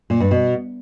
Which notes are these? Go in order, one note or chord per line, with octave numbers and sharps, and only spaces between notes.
A#2
G2
B2